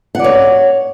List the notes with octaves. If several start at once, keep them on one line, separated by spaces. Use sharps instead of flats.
C#5 D5 F#5